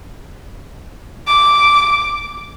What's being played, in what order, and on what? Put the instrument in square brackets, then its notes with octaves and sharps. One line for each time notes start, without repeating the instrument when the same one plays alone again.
[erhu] D6